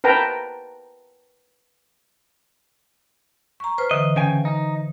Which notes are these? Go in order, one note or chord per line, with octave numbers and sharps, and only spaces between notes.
A#4 B4 G5 A5 A#5
A#5 C#6
B4 C5 F6
D3 E3 D#5
C#3 G5 G#5
D#4